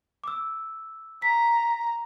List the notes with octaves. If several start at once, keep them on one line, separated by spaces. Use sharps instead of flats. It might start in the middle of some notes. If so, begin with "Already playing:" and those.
D6 E6
A#5 B6